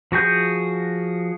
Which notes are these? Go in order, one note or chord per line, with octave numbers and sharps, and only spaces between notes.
F3 F#4 G#4 G6